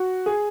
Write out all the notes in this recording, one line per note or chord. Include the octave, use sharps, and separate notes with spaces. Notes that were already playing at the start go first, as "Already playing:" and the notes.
Already playing: F#4
G#4